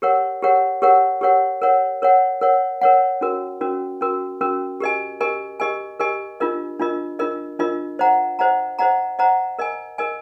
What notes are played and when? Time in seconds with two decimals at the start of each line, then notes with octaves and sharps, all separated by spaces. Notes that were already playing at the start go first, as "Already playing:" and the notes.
0.02 G4 A#4 C#5 F#5
0.42 G4 A#4 C#5 F#5
0.82 G4 A#4 C#5 F#5
1.21 G4 A#4 C#5 F#5
1.62 A#4 C#5 F#5
2.02 A#4 C#5 F#5
2.41 A#4 C#5 F#5
2.81 A#4 C#5 F#5
3.21 C#4 F#4 A#4
3.61 C#4 F#4 A#4
4.01 C#4 F#4 A#4
4.41 C#4 F#4 A#4
4.80 G4 A#4 D#5 G#5
5.21 G4 A#4 D#5 G#5
5.60 G4 A#4 D#5 G#5
6.00 G4 A#4 D#5 G#5
6.40 D4 F4 A#4 D#5
6.79 D4 F4 A#4 D#5
7.19 D4 F4 A#4 D#5
7.59 D4 F4 A#4 D#5
7.99 C5 D#5 F#5 A#5
8.39 C5 D#5 F#5 A#5
8.79 C5 D#5 F#5 A#5
9.19 C5 D#5 F#5 A#5
9.59 A#4 D#5 G#5
9.98 A#4 D#5 G#5